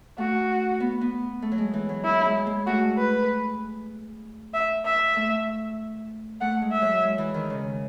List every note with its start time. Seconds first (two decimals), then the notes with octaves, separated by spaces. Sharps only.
0.18 A3 F#4
0.80 B3
1.01 B3
1.42 A3
1.52 F#3
1.58 G#3
1.74 E3
1.89 F#3
2.05 E4
2.26 G#3
2.47 G#3
2.67 A3 F#4
2.98 B4
4.54 E5
4.85 E5
5.16 A3
6.41 A3 F#5
6.62 G#3
6.72 E5
6.82 F#3
7.03 G#3
7.18 E3
7.34 D#3
7.50 C#3